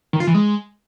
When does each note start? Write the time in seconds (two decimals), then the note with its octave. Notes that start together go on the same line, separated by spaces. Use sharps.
0.13 D#3
0.20 F4
0.27 E3
0.34 G#3